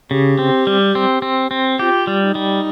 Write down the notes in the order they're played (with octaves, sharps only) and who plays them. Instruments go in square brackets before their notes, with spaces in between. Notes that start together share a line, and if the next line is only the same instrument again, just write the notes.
[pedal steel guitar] C#3 [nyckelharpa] G4
[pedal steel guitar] C4
G3
C4
C4
C4
[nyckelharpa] F4 [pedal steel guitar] G4
[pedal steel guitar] G3
[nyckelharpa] D#4
[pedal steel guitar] G3